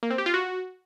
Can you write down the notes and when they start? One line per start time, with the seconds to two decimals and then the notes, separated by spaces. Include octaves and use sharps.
0.03 A#3
0.10 C4
0.18 G4
0.26 F4
0.34 F#4